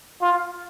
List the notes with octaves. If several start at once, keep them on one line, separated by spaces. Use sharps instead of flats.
F4